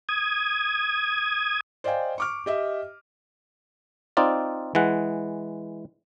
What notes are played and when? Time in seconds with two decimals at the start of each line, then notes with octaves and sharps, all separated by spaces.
0.09 D#6 G#6
1.84 C5 D5 D#5 F5 G5 G#5
2.18 C#6 D6 F6
2.46 G4 D#5 E5
4.17 C4 D#4 F4 D5
4.75 E3 G#3 F#5